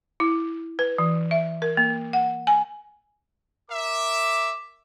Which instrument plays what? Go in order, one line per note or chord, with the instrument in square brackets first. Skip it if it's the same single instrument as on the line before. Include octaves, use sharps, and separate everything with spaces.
[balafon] E4
B4
E3
E5
A#4
A#3
F#5
G#5
[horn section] A#4 E5 [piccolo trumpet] D6